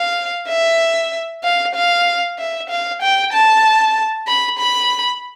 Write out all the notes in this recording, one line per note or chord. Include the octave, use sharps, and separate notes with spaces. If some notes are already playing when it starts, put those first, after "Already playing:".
Already playing: F5
E5
F5
F5
E5
F5
G5
A5
B5
B5